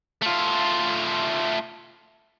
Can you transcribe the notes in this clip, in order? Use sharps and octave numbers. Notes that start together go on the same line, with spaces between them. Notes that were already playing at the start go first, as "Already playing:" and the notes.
A3 F4